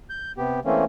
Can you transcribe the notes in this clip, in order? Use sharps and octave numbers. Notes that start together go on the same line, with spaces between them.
G6
C3 B3 G4
E3 A3 A#3 C4 C#4